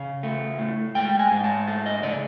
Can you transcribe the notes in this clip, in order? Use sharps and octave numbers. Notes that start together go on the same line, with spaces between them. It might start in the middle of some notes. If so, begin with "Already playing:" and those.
Already playing: C#3 F5
A3
A2
G#3 G5
G#5
G#2
A5
A3 A5
D#5
C#3 D5